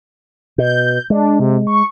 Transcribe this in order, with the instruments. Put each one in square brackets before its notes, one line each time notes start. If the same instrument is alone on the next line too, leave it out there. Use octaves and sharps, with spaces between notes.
[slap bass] B2 [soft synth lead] G6
[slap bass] G#3 [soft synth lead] D4
[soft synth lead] C3
C#6